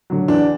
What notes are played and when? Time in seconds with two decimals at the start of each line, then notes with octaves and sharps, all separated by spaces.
0.10 D3 F#3
0.28 E2 D4